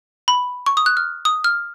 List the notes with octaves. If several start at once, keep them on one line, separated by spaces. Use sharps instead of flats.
B5
C#6
D#6
F#6
F6
D#6
F6